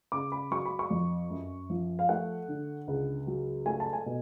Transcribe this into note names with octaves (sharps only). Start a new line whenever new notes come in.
C#3 D6
B5
F#3 C#6
B5
C#6
F2
F#2
F3
F5
A3 F#5
D3
C#2
F#3
A3 G#5
A5
G#5
B2